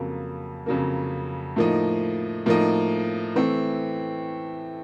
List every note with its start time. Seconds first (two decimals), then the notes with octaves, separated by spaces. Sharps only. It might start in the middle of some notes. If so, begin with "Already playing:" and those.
Already playing: F2 C#3 F#3 A#3
0.66 F2 C#3 F#3 A#3
1.56 A2 F3 A#3 D#4
2.46 A2 F3 A#3 D#4
3.35 E3 A3 C4